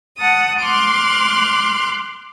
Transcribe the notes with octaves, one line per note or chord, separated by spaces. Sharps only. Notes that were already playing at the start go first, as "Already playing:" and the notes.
F#5 A5 D#6
C6 D6 F6 F#6